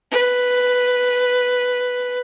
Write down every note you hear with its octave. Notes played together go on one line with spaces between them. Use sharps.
B4